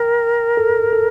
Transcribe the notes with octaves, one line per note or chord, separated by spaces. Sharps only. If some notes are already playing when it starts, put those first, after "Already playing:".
Already playing: A#4 G5
A4
A4